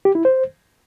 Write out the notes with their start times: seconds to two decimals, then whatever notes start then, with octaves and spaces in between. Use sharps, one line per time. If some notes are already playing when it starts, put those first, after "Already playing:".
0.05 G4
0.15 E4
0.25 C5